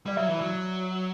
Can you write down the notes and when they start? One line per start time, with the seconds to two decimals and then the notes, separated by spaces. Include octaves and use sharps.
0.06 G3 D5
0.17 F#3 E5
0.29 E3
0.41 F#3